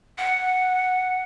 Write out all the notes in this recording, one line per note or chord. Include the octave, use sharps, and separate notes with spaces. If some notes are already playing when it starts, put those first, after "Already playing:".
F#5